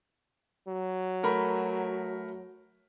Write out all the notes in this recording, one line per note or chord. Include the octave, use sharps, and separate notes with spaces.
F#3
A3 A#4 B5